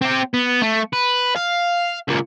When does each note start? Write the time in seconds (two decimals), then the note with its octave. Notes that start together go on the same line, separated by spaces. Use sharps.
0.02 C4 G4
0.34 B3
0.62 A3
0.93 B4
1.36 F5
2.08 C#2 A#2